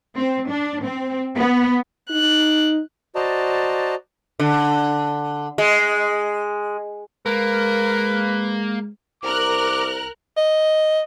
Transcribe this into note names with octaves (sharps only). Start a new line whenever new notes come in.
C4
D4
C4
B3
D#4 F#6
F#4 C5 D5 D#5 A5 A#5
D3
G#3
G#3 A#3 A#4 B4
C2 A#4 D6 F6 F#6
D#5